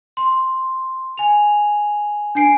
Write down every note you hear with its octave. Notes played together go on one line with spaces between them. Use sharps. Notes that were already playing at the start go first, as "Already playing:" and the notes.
C6
G#5 F7
D4 G#5 C7 D7